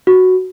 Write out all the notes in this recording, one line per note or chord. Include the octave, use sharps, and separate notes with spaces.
F#4